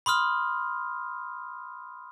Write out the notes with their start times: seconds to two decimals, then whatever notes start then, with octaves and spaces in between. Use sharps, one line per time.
0.06 B5 C6 D#6 F6